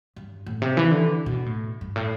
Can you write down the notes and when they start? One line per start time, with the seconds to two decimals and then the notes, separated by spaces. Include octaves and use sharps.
0.16 G2
0.47 A2
0.62 C3
0.77 E3
0.91 D3
1.26 B2
1.46 A2
1.81 G2
1.96 A2